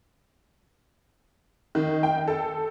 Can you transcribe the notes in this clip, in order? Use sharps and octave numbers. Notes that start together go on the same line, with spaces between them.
D#3
G5
A4